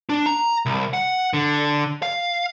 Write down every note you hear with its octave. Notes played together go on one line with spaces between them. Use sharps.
D4
A#5
C2
F#5
D3
F5